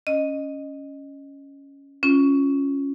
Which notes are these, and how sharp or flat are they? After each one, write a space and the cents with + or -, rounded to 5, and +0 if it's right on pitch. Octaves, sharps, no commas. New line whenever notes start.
C#4 +5 D#5 -10
C#4 +0 F4 +0